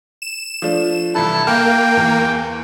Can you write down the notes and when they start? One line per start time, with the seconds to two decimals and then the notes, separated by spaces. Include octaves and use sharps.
0.22 E7
0.62 F3 A3 D4
1.15 C2 E3 E4 A4 A5
1.47 A#3 G5 F6
1.97 E2